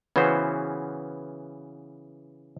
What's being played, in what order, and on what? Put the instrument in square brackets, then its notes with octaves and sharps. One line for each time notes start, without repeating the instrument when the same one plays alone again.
[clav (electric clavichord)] C#3 E3 B3 C#4 F#4 C5